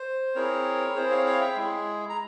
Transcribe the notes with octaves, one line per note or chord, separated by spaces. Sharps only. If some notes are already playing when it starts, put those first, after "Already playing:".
Already playing: C5
C4 E4 G#4 A#4 C#5
C4 E4 G#4 C5
C#5 F5
C#5 F5
E5 G5
G#3 E4 G#4
A#5